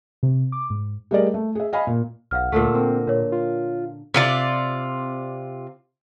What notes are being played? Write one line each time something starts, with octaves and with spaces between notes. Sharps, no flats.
C3
D6
G#2
G3 A3 G#4 A#4 D5 D#5
A3
G#4 E5
D#5 F5 G#5 B5
A#2
B1 F5 F#5 F6
D2 A#2 D3 A3
A#3 C4
A#2 A#4 C#5
F4
C3 F4 D5